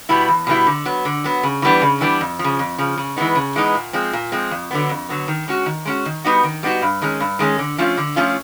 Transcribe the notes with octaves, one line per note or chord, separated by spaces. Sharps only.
B2 G3 B3 E4
E2
B2 G3 B3 E4
D3
F#3 B3
D3
F#3 B3
C#3
E3 G3 B3 D4
C#3
E3 G3 B3 D4
F2
F3
C#3
F2
C#3 F3
C#3
E3 G#3 B3 D#4
C#3
E3 G#3 B3 D#4
A#2
F3 G#3 C4
A#2
F3 G#3 C4
F2
D3 F#3 B3
F2
D3 F#3 B3
D#3
G#3 C#4 F#4
D#3
G#3 C#4 F#4
D#3
G3 B3 D#4 F#4
D#3
G3 B3 D#4 F#4
G2
D#3 G#3 C#4
G2
D#3 G#3 C#4
D3
F3 A3 C#4 F4
D3
F3 A3 C#4 F4